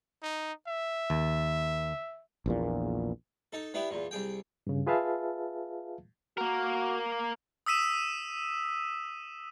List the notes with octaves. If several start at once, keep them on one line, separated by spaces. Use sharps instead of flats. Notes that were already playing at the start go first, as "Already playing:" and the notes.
D#4
E5
D#2
A#1 E2 A#2
D#4 A4
B3 D4 E4 G4
E2 A#2
C2 G#4 G5
G2 C#3
F4 G#4 B4 E5 F5 A5
A#3 F#4 A#4
D#6 E6 B6 D#7 E7